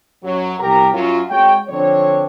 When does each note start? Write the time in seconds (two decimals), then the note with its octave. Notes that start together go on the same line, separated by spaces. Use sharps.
0.24 F#2 F#3
0.59 C2 G4 A#4 A#5
0.93 F#2 F#3 F4
1.29 G#3 C4 F#4 C#5 G5
1.68 D3 F3 C4 D4 C#5